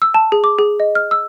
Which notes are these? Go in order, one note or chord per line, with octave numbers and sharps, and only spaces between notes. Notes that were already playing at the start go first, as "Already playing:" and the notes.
E6
A5
G#4
D6
G#4
D#5
F6
E6